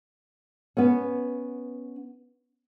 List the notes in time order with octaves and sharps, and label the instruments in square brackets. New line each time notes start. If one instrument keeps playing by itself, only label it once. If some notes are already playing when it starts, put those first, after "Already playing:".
[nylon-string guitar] B3 C#4